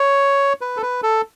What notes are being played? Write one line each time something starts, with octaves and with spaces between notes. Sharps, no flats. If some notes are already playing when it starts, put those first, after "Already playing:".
Already playing: C#5
B4
A4
B4
A4